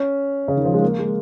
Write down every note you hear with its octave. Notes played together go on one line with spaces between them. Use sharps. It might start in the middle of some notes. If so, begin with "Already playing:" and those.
Already playing: C#4
C#3
D#3
F3
G#3
A#3
G#3